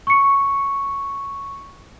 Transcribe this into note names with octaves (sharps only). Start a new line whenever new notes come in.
C#6 C#7